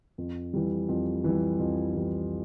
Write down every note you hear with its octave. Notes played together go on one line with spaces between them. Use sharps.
F2
E3 G3
F2
E3 G3
F2
E3 G3